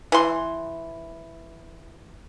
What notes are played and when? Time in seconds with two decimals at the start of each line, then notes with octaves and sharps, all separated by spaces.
0.12 E3 C6